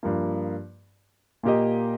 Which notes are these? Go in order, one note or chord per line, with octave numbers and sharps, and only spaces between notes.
G2 F3 A#3
A#2 A#3 G4 D#5